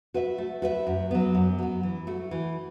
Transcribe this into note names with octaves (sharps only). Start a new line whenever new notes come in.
F#4 B4 E5
A3
F#4 B4 E5
F#2
F#3 B3
F#2
F#3 B3
E3
A3 F#4
E3